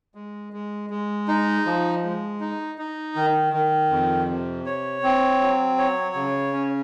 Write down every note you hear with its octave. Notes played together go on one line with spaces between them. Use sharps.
G#3
G#3
G#3
D#4
F3
G#3
D#4
D#4
D#3
D#3
F2
C3
C#5
C4
F#3
C#5
C#3
C#4